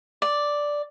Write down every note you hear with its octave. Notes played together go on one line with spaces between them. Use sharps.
D5